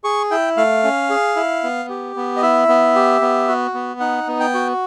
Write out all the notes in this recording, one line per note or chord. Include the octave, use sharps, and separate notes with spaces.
G#4 C#6
E4 G5
A3 F5
C#4
G#4
E4
B3
G4
B3
D#5
E4 E5
B3
G4
B3
F#4
B3
D#4 F#5
B3
G5
F#4